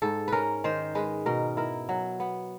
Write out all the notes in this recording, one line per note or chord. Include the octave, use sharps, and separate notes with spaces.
G#2 A4
C#4 A#4 B4
D#3 C5
G#3 B4
B2 A#4
E4 A#4
F#3
B3